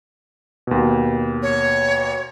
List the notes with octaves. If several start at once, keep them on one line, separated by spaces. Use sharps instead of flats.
D#2 B2
C#5